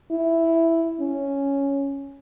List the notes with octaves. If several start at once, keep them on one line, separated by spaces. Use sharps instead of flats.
E4
C#4